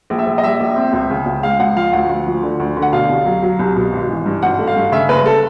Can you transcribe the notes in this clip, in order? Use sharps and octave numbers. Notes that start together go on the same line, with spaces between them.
A#1
E5
A#1
D#5
G3 E5
A#1
C4
C#2
C#3
C#2
G#3 F5
C#2 F#5
F3 F5
D2 F#5
D2
F3
D3
D2
D3
F#5
B2 F5
C2
F#3
F#3
C2
B2
G#1
E3
G2
G#1 F#5
A3
F5
G2
C#3 E5
F#1 B4
A4